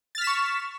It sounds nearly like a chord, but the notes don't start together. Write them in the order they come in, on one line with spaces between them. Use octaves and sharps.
A6 F6 B6 E7 C#6